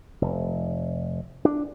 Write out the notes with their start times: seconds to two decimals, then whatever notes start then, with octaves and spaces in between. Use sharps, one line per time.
0.22 F1
1.45 D4